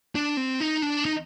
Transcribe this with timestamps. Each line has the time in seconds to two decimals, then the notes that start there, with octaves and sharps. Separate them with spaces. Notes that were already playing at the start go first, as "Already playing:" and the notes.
0.15 D4
0.37 C4
0.60 D#4
0.82 D4
1.05 D#4